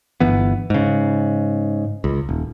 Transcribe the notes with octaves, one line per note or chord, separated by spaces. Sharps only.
G1 E3 B3
G#2 C#3
C#2
D#1